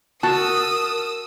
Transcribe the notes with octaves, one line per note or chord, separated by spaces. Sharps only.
F#4 A#4 A5 D#6 E6